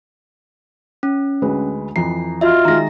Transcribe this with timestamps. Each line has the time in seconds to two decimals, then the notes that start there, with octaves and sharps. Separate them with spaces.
1.03 C#4
1.42 D2 G#3 B4
1.96 F2 E3 A#5 C7
2.41 F4 F#4 D#5 E5
2.65 D#3 G#3 A#5 A#6